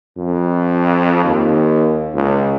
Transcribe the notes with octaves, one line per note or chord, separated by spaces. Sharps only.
F2
D#2
C#2